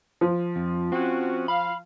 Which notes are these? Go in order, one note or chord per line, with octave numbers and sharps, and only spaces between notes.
F3
F2
C4 C#4 F#4
F5 B5